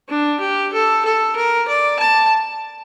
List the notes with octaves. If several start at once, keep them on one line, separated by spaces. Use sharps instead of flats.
D4
G4
A4
A4
A#4
D5
A5